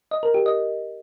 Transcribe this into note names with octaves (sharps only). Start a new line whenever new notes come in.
D#5
A#4
G4
D#5